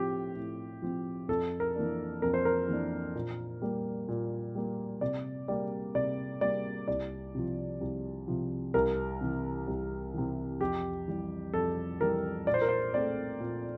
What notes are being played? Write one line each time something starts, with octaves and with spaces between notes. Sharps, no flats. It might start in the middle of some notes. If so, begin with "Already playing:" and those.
Already playing: A2 F3 C4 G4
A2
F3 C4
F2 A4
A#4
E3 A#3 D4
F2 A#4
C5
A#4
E3 A#3 D4
A#2
G3 A#3
A#2
G3 A#3
C3 D5
G3 A#3 D5
C3 D5
G3 A#3 D5
C2 D5
C3 F3
C2
C3 F3
C2 A#4
C3 E3
C2
C3 E3
F2 G4
E3 G3
F2 A4
E3 G3 A#4
A#2 D5
C5
A#4
C5
A3 C4 D5
A#2